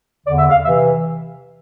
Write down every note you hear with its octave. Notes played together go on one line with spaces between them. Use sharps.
E2 D3 D5
E5
F5
C3 E3 E5